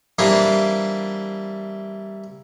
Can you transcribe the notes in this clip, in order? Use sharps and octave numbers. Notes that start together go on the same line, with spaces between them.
E3 G3 A#3 C4 D4